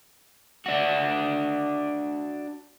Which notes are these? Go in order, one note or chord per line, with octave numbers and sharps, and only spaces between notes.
D4 F#4